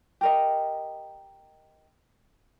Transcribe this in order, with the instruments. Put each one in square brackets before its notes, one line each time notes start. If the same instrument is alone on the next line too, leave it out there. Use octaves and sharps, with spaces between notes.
[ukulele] G4 A#4 D#5